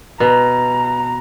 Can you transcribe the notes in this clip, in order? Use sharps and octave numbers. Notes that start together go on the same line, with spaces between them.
B2 A#5